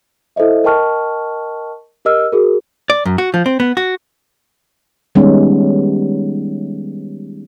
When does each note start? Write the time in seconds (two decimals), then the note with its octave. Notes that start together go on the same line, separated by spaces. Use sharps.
0.36 E4 A4 C5 D#5 E5
0.64 A#4 D#5 G5 A5 C#6 F6
2.05 G4 A#4 D#5 E6 F6
2.32 F#4 G#4 A#4
2.90 D5
3.06 F#2
3.18 F#4
3.34 F3
3.46 C4
3.60 B3
3.77 F#4
5.15 D#3 G3 G#3 B3 C#4 D#4